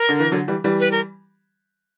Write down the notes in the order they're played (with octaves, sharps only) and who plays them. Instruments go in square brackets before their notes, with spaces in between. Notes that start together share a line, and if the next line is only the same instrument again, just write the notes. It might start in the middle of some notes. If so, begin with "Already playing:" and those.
Already playing: [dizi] A#4
[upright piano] D3
E3
D3 F#3
E3 G3
E3 G3
[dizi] B4
A#4